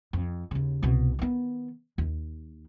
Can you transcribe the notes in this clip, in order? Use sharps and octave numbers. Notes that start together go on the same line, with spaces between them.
F2
D#2 C#3
C2 B2
D#3 B3
D#2